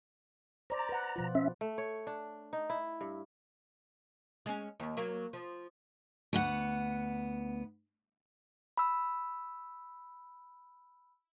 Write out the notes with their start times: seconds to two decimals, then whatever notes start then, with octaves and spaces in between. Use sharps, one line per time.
0.70 C5 D5 A#5
0.89 B4 F#5
1.16 B2 F3 F4
1.35 C#4 E5
1.61 A3
1.78 C#5
2.07 D4
2.53 D#4
2.70 E4
3.01 G2
4.46 G#3 C#4
4.80 D#2
4.97 F#3 A#3
5.33 F3
6.33 D2 B3 F#5
8.77 B5 E6